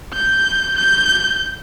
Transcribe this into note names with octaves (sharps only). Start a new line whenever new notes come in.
G6
G6